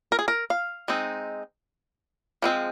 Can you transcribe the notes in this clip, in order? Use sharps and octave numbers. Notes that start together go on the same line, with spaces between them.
A#4
G#4
A#4
F5
G#3 C4 D#4
F3 G#3 C4